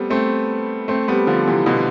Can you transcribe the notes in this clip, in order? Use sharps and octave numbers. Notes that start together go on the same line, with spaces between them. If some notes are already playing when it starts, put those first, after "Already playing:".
Already playing: G3 A3 B3 C4
A3 C4
A3 C4
G3 B3
D3 F3
C3 E3
B2 D3